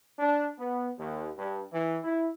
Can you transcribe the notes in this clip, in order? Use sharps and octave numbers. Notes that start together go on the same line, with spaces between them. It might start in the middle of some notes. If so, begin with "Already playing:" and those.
D4
B3
D#2
G2
E3
E4